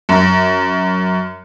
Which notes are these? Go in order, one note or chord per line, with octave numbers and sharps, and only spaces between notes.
F#2